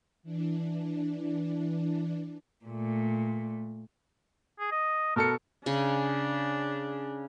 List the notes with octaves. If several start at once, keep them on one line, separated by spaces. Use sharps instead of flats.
E3 D4
A#2 A3
G#4
D#5
B2 A4 A#4 C#7
C#3 D4